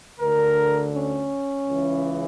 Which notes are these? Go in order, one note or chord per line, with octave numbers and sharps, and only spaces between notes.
D2 D3 A#4
C#4
C#2 C#3 E3